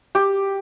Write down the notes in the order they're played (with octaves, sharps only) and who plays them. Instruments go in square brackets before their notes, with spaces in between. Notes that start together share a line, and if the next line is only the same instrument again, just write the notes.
[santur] G4